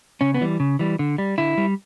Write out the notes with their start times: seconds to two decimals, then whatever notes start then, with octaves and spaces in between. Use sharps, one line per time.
0.21 C#3 C#4
0.34 B3
0.41 E3 G3
0.60 C#3
0.79 E3 G3
0.99 D3
1.18 G3
1.38 D3 E4
1.58 G3